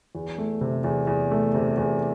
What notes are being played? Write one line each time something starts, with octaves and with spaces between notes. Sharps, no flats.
E2
A3
C3
E2
E2
A3
C3
E2